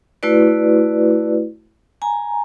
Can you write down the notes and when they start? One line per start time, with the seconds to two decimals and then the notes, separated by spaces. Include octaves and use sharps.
0.23 A3 E4 F#4 B4 D5
2.02 G#5 A#5